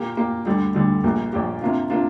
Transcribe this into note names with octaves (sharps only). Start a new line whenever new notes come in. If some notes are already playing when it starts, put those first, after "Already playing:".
Already playing: A#2 A#3 G4
A#2 A#3 G4
D2 D3 G3
D2 D3 G3
A#1 A#2 A#3 G4
A#1 A#2 A#3 G4
C3 A#3 D4 F4
C3 A#3 D4 F4